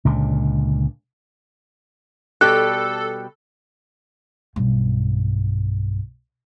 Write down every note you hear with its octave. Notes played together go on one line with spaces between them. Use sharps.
C#2 A#2 D3
B2 G3 G4 A4 F#6
B1 G2